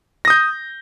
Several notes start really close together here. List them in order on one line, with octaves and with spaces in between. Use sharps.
A#6 D#6 G6